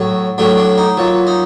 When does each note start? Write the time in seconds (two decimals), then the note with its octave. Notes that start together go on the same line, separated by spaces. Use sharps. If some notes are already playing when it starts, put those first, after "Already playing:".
Already playing: A2 F#3
0.38 A2 F#3 D4
0.58 D4
0.78 D#4
0.97 A#2 F#3
1.27 D#4